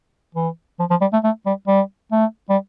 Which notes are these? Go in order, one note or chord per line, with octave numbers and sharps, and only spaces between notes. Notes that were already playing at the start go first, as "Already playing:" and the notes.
E3
F3
F3
G3
A3
A3
G3
G3
A3
G3